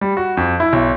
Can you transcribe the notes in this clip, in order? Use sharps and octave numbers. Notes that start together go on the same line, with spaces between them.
G3
F#4
F2
E4
B1